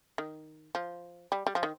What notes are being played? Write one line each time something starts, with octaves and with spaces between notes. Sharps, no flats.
D#3
F3
G3
G3
F3
D#3